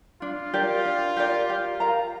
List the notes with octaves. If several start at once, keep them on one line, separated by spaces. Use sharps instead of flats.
D4 F4
G4 A#4 D5
D4
G4 A#4 D5
G4
A#4 F5 A#5